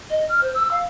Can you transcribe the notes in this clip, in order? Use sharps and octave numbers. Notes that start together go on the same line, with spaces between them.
D#5
F6
C5
E6
F5